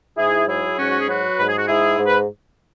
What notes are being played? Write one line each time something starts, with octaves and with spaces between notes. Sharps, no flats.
G#2 E4 G#4
F#3 E4 G#4
G#2 C#4 F#4
F#4
G#4
F#3 F#4 B4
G#2 B4
G#4
F#4
G#2 E4 G#4
G#2
B4